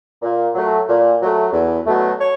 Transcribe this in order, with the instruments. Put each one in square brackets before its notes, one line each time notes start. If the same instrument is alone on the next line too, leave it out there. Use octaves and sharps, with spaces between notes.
[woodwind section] A#2
F#3 A3
A#2
F#3 A3
E2
B2 F#3 A3
C#5